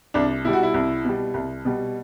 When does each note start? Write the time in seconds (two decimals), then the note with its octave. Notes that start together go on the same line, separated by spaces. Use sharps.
0.14 C2 D4
0.45 B2 G3 E4
0.53 F#4
0.63 E4
0.74 C2
1.05 B2 G3
1.34 C2
1.65 B2 G3